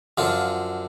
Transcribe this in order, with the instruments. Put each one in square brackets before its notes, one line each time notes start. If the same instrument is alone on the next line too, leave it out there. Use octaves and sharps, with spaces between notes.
[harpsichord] F#2 D3 F3 F4